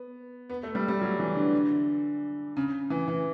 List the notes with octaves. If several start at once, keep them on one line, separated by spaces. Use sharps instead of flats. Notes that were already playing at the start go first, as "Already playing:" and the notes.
Already playing: B3
B3
A3
G3
G3
F#3
E3
D3
C#3
E3
E3